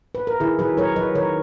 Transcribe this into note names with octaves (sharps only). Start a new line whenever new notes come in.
B4
A#4
D#3 E4 G#4
F#3 G#4 B4
F#3 A#4 C#5
F#3 B4 D#5
D#3 A#4 C#5